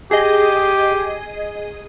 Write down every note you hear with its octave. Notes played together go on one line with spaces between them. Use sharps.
G4 G#4 D#5